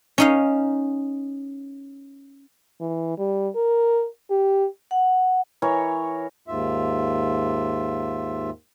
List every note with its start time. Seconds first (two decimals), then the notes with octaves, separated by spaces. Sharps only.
0.18 C#4 D#4 F5
2.81 E3
3.18 G3
3.55 A#4
4.30 G4
4.91 F#5
5.62 E3 A#4 C#5
6.48 D#2 G#2 F4 E5